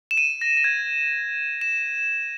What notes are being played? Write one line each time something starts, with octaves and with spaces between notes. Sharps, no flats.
E7
D#7
A#6
A#6
G#6
E7